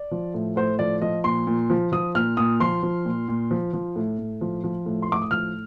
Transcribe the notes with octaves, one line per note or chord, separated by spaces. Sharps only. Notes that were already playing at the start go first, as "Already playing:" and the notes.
Already playing: D5
F3
A2
A2 C5
F3 D5
F3 D#5
A#2 C6
A#2
F3
F3 D#6
A#2 F6
A#2 D#6
F3 C6
F3
A#2
A#2
F3
F3
A2
A2
F3
F3
A2
C6
A2 D6
D#6
F3 F6